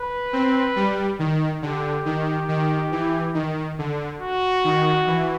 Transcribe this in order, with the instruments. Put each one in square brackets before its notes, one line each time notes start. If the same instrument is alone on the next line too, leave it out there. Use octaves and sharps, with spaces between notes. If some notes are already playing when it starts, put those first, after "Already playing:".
Already playing: [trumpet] B4
[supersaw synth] C4
G3
D#3
[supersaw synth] D3 [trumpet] G4
[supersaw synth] D#3
D#3
E3
D#3
D3
[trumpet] F#4
[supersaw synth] D#3
E3